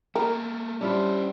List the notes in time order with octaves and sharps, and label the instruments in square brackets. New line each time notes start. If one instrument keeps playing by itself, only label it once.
[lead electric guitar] A3 A#3 [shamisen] A#4
[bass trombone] G3 [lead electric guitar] C#4 C5 [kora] D4 E4 F4